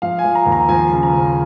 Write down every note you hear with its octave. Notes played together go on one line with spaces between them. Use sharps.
F3 F5
G#5
F3
A#5
D#2
A#5
F3 G#5
C#3
A#5
F3